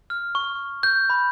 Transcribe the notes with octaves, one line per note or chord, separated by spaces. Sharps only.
F6
C#6
G6
B5